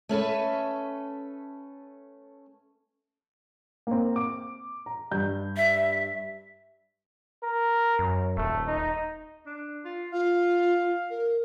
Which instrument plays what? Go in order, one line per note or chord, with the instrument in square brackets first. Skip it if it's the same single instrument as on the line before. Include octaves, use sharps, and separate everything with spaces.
[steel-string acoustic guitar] A3 C#4 A4 B4
[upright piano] A#3 C4
D6
A#5
G2 G6
[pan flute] E5
[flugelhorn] A#4
[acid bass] F#2
[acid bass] D#1 [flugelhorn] A3
[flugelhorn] D#4
[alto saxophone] D4
F4
[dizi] F4 [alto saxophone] F5
[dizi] A#4